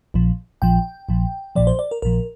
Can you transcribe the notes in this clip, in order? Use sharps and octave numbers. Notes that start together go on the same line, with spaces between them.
A#1 A#2 F3
A#1 A#2 F3 G5
A#1 A#2 F3
A#1 A#2 F3 D5
C5
D5
A#4
A#1 A#2 F3 A#4